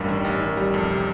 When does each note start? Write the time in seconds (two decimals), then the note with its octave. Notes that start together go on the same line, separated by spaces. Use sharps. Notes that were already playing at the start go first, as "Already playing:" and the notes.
Already playing: A1 G2 G3 A#4
0.09 D#3
0.25 A1
0.41 D#3
0.57 G3
0.74 F2
0.90 C3